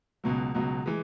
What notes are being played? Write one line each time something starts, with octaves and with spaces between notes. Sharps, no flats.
C#2 B2 F#3
C#2 B2 F#3
E3 G#3